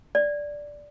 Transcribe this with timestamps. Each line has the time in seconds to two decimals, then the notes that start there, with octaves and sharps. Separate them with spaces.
0.15 D5